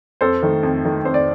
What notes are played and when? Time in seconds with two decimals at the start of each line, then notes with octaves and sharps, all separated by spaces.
0.21 F2 A4 C5
0.43 D#3 A3
0.63 F2
0.85 D#3 A3
1.05 F2 C5
1.14 D5